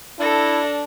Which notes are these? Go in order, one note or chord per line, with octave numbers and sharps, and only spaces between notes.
D4 E4 A4 A#6